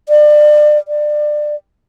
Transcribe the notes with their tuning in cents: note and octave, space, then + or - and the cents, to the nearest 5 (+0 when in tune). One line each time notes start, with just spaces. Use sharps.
D5 +30
D5 +25